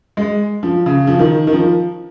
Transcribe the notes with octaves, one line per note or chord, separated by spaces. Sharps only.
G#3
F3
C#3
F3
D#3
D#3
F3